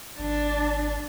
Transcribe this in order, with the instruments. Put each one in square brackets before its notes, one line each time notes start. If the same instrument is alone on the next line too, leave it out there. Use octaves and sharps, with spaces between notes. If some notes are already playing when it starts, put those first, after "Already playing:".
[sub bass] G#1 [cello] D4